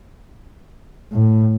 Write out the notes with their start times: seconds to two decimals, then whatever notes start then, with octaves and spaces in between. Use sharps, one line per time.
1.13 A2